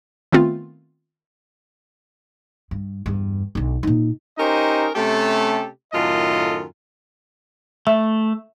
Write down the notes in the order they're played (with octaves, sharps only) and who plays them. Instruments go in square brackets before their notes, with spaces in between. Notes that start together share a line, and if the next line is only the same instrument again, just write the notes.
[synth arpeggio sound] D#3 A3 B3 C4 F4
[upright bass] G2
E2 G2
B1 D3
A#2 D#4
[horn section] C#4 D#4 G4 A#4 C5 D#5
C3 A3 C#4 G4 A4
F#2 A2 D#3 F4 A4 D#5
[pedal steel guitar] A3 [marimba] E5